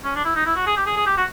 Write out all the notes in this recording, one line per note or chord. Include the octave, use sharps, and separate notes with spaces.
C#4
D4
E4
D#4
E4
F#4
G#4
G4
G#4
G#4
G4
F#4